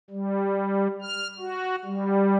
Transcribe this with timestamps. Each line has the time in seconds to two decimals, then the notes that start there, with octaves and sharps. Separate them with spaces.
0.10 G3
1.02 F6
1.39 F#4
1.85 G3